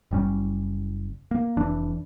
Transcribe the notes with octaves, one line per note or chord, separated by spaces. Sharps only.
F#1 G3 C#4
A#3
F1 E3 D4